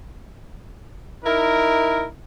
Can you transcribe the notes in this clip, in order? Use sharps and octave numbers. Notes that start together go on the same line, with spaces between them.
D#4 E4 A#4